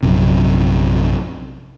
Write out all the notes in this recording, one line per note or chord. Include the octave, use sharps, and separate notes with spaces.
A#1 F#2 C3